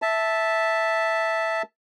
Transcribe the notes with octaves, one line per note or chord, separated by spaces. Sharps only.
E5 A5